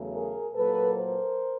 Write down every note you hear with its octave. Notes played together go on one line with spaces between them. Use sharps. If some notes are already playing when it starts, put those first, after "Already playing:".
Already playing: E2 C#3 F#3 A3
G#4 A#4
A#2 F#3 A#3 A4 B4
A#4 C5